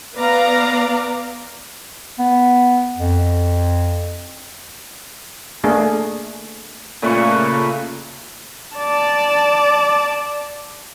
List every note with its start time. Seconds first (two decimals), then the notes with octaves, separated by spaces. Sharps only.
0.15 B3 B4 D5 F5 A#5
2.19 B3
2.97 F2
5.64 A3 A#3 D4 G#4 A4
7.02 A#2 C#3 A3 A#3 B4 C#6
8.77 D5 A5